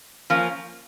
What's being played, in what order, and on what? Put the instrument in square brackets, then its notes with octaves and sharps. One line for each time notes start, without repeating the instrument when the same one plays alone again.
[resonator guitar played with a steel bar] F3 A#3 C#4